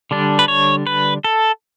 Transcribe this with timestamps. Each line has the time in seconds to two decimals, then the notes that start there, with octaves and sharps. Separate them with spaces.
0.11 D3 G3 D4
0.39 B4
0.48 C#5
0.87 B4
1.24 A4